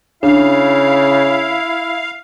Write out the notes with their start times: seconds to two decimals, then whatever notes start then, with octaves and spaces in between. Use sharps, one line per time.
0.23 C#3 D4 E4 F5